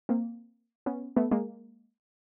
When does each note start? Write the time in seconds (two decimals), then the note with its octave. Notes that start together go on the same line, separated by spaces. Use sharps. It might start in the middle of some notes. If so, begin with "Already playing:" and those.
0.09 A#3 C4
0.86 B3 C#4
1.16 A3 B3
1.31 G#3 A#3